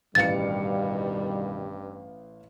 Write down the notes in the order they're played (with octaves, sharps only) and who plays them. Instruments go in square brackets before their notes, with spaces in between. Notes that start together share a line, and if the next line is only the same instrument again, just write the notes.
[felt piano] A1 F5 C#7 [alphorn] G2 [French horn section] B2 D#3 G3 [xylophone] A6